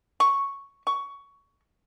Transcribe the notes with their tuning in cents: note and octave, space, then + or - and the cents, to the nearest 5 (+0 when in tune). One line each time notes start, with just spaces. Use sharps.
C#6 +0
C#6 +15